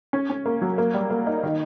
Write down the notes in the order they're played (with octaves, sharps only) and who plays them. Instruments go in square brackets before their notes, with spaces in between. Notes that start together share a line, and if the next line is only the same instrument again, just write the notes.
[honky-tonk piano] C#4
C#4
A#3
F#3
A#3
G3
A#3
D#4
D#3